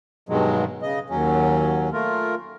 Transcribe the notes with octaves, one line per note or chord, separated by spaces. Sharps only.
G2 B2 D#3 F#3 G#3
C#3 D#5
D#2 F#3 C#4
A3 F4 A#4